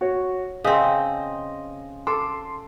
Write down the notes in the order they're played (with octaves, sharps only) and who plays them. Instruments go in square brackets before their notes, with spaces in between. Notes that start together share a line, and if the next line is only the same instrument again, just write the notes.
[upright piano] F#4 C#5
[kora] C#3 C4 [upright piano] D#5 D#6
[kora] A4 [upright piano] C6 D6